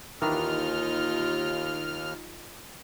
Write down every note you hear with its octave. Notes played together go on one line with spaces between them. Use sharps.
D#2 D#3 E3 D4 D#4 F4 F6